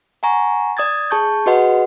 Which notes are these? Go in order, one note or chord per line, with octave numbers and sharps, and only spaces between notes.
F#5 G#5 A#5 C#6
D5 D#6 G#6 A6
G#4 A5 C#6 G6
F#4 G#4 B4 D#5 F#5 C6